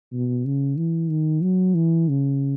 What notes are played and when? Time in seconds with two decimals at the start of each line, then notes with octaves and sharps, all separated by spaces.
0.13 B2
0.45 C#3
0.77 E3
1.10 D#3
1.43 F#3
1.75 E3
2.09 C#3